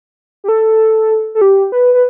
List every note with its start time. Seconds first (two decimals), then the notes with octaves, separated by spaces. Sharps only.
0.44 G4
0.48 A4
1.35 A4
1.41 G4
1.72 B4
1.94 B4